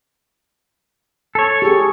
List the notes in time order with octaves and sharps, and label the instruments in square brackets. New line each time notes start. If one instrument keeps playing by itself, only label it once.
[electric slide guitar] A4 C#5
[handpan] G4 G#4